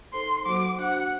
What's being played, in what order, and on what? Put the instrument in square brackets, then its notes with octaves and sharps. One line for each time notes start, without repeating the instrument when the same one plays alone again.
[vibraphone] D#4 A4 C5 [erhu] C6
[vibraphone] F#3 A#3 F#4 C5 F#5 [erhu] D6
[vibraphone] D4 F#4 C5 [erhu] F#5